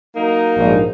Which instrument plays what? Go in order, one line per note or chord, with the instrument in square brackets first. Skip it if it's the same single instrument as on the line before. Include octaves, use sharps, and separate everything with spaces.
[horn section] F#3 A#3 D#4
[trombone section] A#1 G#2